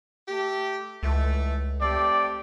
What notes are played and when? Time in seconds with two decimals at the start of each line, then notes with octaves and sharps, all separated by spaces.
0.28 A3 G4
1.03 C#2 E3 A3
1.81 A3 C4 G4 D5